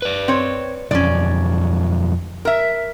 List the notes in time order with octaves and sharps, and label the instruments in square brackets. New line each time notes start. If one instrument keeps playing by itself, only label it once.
[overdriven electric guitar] B4 D5
[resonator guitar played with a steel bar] C4 C#5
[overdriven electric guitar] B1 F2 [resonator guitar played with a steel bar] C#4 D5
[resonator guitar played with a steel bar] A#4 E5